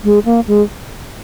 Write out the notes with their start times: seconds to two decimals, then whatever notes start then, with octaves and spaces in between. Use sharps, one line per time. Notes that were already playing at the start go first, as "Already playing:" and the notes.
0.04 G#3
0.25 A#3
0.47 G#3